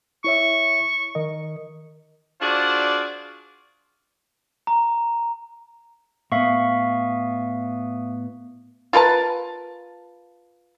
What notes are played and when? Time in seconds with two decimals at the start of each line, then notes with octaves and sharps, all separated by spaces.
0.24 E4 C#5 E5 C#6
1.15 D#3 A#4 D#5
2.41 D4 F4 F#4 G#4 C5 D5
4.67 A#5
6.32 A2 B3 E5 F5 C#6
8.93 F4 A#4 B4 A5